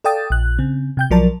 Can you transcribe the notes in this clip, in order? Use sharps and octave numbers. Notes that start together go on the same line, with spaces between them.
A4 D5 F5 G5 D#6 A6
A#1 F#6
C#3 C4
C3 G5 G6
B1 F3 F#3 A#4 D5 A5